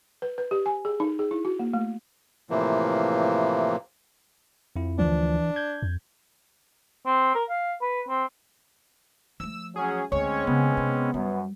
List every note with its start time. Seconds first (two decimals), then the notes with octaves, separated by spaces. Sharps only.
0.22 B4
0.38 B4
0.51 G4
0.66 G#5
0.85 G#4
1.00 D#4
1.19 G#4
1.31 E4
1.45 F#4
1.59 A#3
1.73 A3
2.50 A2 C3 E3 F3 A#3
4.76 F2 F3 E4
4.99 D2 E3 F3 D4
5.56 G6 G#6
5.82 F2
7.06 C4
7.35 A#4
7.49 F5
7.82 B4
8.09 C4
9.40 F3 A3 E6
9.76 F#3 C#4 G#4
10.12 D2 G#3 C4 C#4 C#5
10.47 C#3 B3
10.77 C3
11.14 F#2 G3